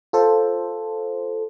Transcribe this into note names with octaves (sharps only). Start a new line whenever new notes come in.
F4 A4 C5